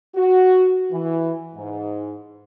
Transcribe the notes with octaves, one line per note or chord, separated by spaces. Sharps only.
F#4
E3
G#2